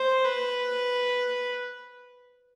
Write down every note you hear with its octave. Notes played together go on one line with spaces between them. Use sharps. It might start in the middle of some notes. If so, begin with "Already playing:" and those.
Already playing: C5
B4